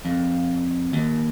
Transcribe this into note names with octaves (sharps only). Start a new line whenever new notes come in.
F2
D#2